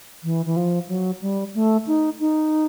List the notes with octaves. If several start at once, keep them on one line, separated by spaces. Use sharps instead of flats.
E3
E3
F3
F#3
G3
A3
D#4
D#4